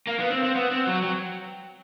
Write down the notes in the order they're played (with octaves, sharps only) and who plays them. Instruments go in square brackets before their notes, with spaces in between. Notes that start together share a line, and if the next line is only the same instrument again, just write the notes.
[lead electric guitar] A#3 [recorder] F5
[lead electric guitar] B3
C4
C4
[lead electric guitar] B3 [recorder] F#5
[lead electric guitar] C4
F#3
[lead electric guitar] F#3 [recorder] G5